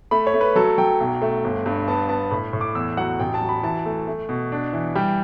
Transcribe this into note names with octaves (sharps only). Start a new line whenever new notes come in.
A3 B5
C#5
A3
B4
F#3 A4
F#3 G5
B1
A3
G1
G2
B3 A5
B3 A5
A2 B5
A2
D6
E2 E6
F#3 F#5
A1 G5
A5
F#3
B5
E3 A5
A3
A3
B2
D4
E3
G3 G5